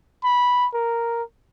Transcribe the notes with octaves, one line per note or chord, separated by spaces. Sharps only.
B5
A#4